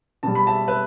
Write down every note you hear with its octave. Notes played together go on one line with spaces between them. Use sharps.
B2 G3 A5
B5
E5 A5
B4 E5